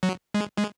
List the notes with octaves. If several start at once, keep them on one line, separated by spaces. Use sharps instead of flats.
F#3
G#3
G#3